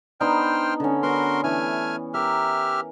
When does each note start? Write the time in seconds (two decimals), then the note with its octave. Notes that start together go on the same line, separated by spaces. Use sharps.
0.21 B3 D4 D#4 C5 G5 F6
0.80 D3 C#4
1.03 B3 F#4 A#4 C6
1.44 E3 A3 G#5 F6
2.14 G4 A#4 E5 F6